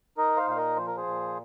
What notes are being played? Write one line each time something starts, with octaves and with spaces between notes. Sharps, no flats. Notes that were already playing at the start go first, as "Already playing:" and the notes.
D#4 A#4 D#5
C5 F5
A#2 F5
A#4 D#5
F3 C5
A#4
G#4 C5
A#2